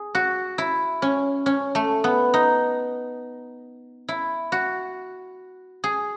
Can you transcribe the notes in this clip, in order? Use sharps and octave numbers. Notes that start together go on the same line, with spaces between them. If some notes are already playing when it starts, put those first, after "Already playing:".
Already playing: G#4
F#4
E4
C#4
C#4
A3
B3
D#4
E4
F#4
G#4